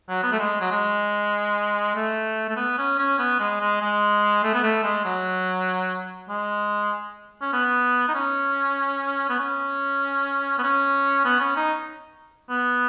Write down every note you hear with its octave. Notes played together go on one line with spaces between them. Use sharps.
F#3
B3
A3
G#3
F#3
G#3
A3
A3
B3
C#4
C#4
B3
G#3
G#3
G#3
A3
B3
A3
G#3
F#3
G#3
C#4
B3
D#4
C#4
B3
C#4
B3
C#4
B3
C#4
D#4
B3